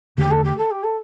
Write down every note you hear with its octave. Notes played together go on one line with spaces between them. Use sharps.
E2 D3 A3 G4
A4
G4
A4
G4
A4